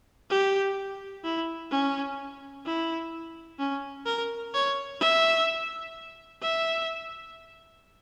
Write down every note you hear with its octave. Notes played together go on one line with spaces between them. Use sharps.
G4
E4
C#4
E4
C#4
A#4
C#5
E5
E5